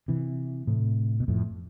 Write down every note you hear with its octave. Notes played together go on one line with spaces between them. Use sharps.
C3 E3
A2 C3
B2
F2 A2